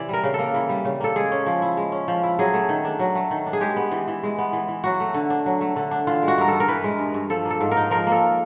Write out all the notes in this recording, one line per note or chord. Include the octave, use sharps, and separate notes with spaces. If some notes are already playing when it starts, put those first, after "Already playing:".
Already playing: C3 E3 D5
G3 A#4
C#3
A4
A#3
E3
G3
C#3
A#3 A4
G#3 G#4
C#4
F3
E4
G#3
C#4
F3
E4
F#3 G#4
A3
D#3
D4
F#3
A3
D#3
D4
G#4
G#3 G4
B3
E3
E3
G#3
B3
E3
E3
F#3 F#4
A3
D3
D4
F#3
A3
D3
D4
E3 F4
G#3
F#4
G2 A#4
A4
G2
A#4
E3 B4
G#3
G2
G2
F3 A4
A#3
A4
G#2
A#4
D#4
F3 A#4
A#3 A4